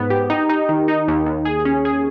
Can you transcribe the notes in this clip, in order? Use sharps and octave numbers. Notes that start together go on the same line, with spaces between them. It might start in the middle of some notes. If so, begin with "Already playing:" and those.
Already playing: G#2 B3
G4
D#4
D#4
D#3
D#4
D#2
D#2
G#4
C#4
G#4